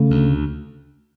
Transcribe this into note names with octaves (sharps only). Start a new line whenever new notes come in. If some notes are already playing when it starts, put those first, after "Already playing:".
Already playing: C#3 A3
D2